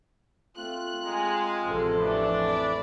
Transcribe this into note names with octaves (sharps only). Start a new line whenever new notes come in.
A3 C4 F4 F#6
G#3 G#5 A#5
A1 F2 C3 A4 C5
E3 A3 D4 B5
D5